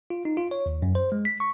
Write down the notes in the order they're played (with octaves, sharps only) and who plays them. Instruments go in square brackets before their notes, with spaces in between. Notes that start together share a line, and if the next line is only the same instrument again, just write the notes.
[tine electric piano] F4
D#4
F4
C#5
D#2
F#2
C5
G#3
B6
C#6